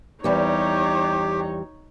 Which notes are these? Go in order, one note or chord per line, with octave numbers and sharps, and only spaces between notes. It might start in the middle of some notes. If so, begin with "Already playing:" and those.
E2 G3 C4 D#4 G4 C#5